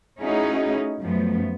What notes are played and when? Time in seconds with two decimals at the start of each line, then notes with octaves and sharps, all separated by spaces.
0.20 A3 C#4 D#4 E4 F#4 G#4
1.00 F#2 F3 A3 B3